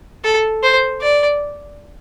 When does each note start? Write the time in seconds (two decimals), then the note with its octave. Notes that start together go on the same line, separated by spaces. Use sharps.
0.24 A4
0.63 C5
1.02 D5